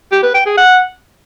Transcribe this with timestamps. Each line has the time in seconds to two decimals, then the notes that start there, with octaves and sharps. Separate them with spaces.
0.12 G4
0.23 B4
0.35 G5
0.46 G#4
0.58 F#5